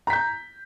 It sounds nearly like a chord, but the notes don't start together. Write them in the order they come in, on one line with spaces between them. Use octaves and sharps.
A#5 B6 G6